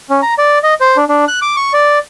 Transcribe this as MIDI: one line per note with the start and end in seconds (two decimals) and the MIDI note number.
0.10 0.21 61
0.22 0.34 82
0.38 0.59 74
0.63 0.74 75
0.81 0.97 72
0.97 1.05 62
1.09 1.25 62
1.28 1.40 90
1.42 1.56 86
1.56 1.73 85
1.73 1.99 74